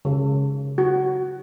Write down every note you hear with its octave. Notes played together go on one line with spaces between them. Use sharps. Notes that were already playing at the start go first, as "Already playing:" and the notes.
C#3
F#4